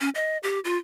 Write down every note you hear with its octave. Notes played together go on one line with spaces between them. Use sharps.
C#4
D#5
G4
F4